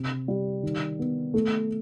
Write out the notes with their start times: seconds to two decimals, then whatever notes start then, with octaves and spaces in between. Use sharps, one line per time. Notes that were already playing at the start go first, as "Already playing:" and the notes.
Already playing: C3
0.28 G3
0.63 D#3
0.99 B3
1.34 A3